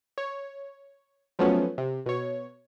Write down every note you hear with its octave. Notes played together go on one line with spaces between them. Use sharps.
C#5
F3 F#3 A3 B3 C#4
C3
B2 C#5